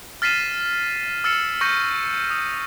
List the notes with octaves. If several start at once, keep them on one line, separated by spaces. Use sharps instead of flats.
F6 A6 B6 C7 D#7 E7
E6 F6 A6 C7 C#7 E7
C#6 G6 A#6 C#7 D#7
D#6 C#7